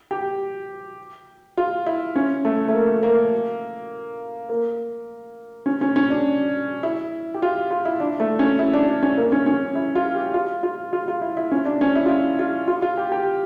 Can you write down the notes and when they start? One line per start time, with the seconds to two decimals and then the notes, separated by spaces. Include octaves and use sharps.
0.11 G4
1.57 F4
1.86 E4
2.16 C#4
2.45 A3
2.68 A3
2.74 A#3
3.03 A#3
4.49 A#3
5.66 C#4
5.81 C#4
5.96 C#4
6.10 D4
6.83 E4
7.34 G4
7.42 F4
7.71 F4
7.85 E4
8.00 D4
8.20 A3
8.39 C#4
8.59 E4
8.73 D4
8.89 D4
9.03 C#4
9.17 A#3
9.32 C#4
9.46 C#4
9.75 E4
9.95 F4
10.15 G4
10.34 F4
10.63 F4
10.93 F4
11.08 F4
11.21 E4
11.37 E4
11.52 C#4
11.65 D4
11.81 C#4
11.95 E4
12.06 F4
12.09 E4
12.39 F4
12.68 F4
12.82 F4
12.97 G4
13.12 G4